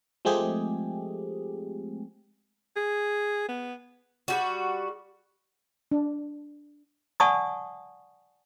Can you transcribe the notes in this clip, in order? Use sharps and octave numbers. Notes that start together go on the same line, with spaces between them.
F3 G#3 A3 C4 G4 G#4
G#4
B3
G3 F#4
D4
D5 F#5 G#5 A5 C#6 D#6